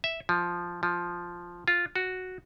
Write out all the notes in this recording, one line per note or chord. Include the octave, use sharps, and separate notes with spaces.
E5
F3
F3
F4
F#4